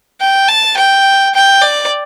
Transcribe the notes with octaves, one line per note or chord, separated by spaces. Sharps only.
G5
A5
G5
G5
D5